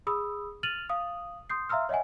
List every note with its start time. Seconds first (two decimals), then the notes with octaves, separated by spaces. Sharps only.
0.07 G#4 B5 D#6 E6
0.63 F6 A6 D#7 F7 F#7
0.89 F5 D#6
1.50 C6 D#6 G6 C7
1.69 E5 F5 A#5 C6 E6 F6
1.89 C#5 D#5 E5 F#5 G#5